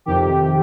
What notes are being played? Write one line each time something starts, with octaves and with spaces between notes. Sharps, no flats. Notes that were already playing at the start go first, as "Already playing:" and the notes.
F2 C3 D#3 G4